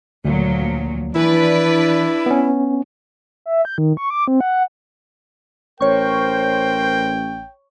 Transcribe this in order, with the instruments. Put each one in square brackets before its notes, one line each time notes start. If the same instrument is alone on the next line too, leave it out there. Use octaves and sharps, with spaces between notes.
[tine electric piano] D2 [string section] A#2 F3 F#3
[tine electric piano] E3 [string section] D4 B4 D5 [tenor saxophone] E4
[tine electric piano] B3 C#4
[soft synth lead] E5
G6
D#3
C#6
D6
C4
F#5
[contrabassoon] A1 [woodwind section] A#4 C5 [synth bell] C#5 C#6 [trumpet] G5